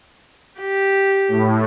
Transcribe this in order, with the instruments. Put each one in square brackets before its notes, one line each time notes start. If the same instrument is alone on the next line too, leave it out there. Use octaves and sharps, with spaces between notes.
[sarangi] G4
[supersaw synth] A2